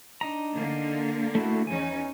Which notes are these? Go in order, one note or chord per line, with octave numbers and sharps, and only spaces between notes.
D4 D#4 A#5
D3 A#3
A3 E4 F#4
E2 C#4 D#4 G#5